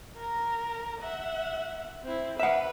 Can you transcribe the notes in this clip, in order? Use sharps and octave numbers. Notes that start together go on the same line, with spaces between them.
A#4 A#5
E5 F#5
C4 E4
B4 E5 F#5